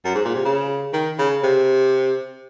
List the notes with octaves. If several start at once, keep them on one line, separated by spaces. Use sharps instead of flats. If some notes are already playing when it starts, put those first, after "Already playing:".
F#2
G#2
A#2
C3
C#3
D#3
C#3
C3